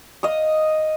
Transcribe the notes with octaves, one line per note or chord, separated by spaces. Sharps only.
D#5 F5 D#6